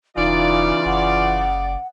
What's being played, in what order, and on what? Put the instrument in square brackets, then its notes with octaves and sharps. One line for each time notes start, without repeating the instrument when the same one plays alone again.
[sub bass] E1 [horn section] C#3 D5 [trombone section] E3 F4 [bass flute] D#4
[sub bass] F#1 [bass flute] F#5